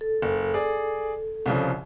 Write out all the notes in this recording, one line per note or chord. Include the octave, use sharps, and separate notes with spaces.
A4
F#1
G#4 D5
C2 C#3 F3